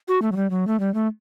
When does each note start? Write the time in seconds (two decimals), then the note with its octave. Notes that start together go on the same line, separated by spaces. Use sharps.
0.08 F#4
0.22 A3
0.32 F#3
0.36 G3
0.50 F#3
0.67 A3
0.80 G3
0.94 A3